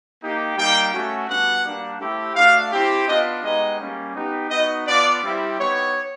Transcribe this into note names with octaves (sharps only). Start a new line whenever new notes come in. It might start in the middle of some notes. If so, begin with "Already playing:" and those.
A#3 D#4 G4
G3 A#3 D#4 G4 G5
A3 C#4 F#4
G3 B3 D4 F#4 F#5
G3 A#3 D4 G4
A3 C4 E4 G4
A3 D4 F#4 F5
C4 E4 G4
B3 D4 F4 D#5
G#3 B3 D#4 G4 D#5
G3 A#3 C#4
B3 D#4 G4
B3 D#4 F#4 D#5
B3 D4 F4 D5
G3 C4 E4 G4
B3 D#4 G4 C#5